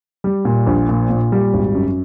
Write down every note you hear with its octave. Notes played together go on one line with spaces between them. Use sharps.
G3
A#2
A#1
A#2
A#2
G3
G#1
F#2